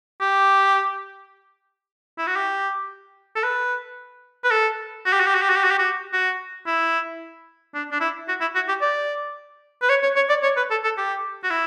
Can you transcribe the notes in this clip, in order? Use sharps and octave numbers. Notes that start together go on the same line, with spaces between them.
G4
E4
F#4
G4
A4
B4
B4
A4
F#4
G4
F#4
G4
F#4
G4
F#4
G4
F#4
G4
F#4
F#4
E4
D4
D4
E4
F#4
E4
F#4
G4
D5
B4
C#5
C#5
C#5
D5
C#5
B4
A4
A4
G4
F#4
E4